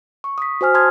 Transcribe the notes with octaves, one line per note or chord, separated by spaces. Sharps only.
C#6
D#6 B6
F#4 C5 G#5 F6
A5 C6 D#6 F6 G#6